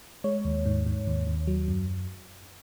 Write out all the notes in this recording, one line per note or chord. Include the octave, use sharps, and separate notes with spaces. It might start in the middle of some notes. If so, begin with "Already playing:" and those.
G#3 C#5
D#2
G#2
G#2
D#2
D#2
F#3
F#2